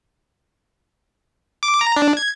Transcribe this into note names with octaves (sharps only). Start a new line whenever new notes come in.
D6
A#5
D4
G#6